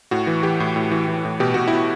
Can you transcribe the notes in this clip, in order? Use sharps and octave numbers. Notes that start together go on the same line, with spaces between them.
A2 F#4
E3
E3 G4
A2
A2
E3
E3
A2
B2 G4
B2 F#4
E4
B2